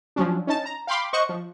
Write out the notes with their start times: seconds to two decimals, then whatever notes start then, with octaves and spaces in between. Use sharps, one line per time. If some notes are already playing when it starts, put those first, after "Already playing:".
0.16 F3 F#3 C#4 D4
0.47 C#4 D#4 A5
0.65 A#5
0.87 F5 G5 B5 C6 D6
1.13 C5 D#5 F#5 C#6
1.29 F3